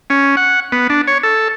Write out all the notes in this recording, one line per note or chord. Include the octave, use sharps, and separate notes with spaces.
C#4
F#5
B3
D4
C#5
A4